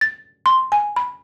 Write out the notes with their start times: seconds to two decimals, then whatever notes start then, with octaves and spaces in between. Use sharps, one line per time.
0.01 A6
0.46 C6
0.72 G#5
0.96 B5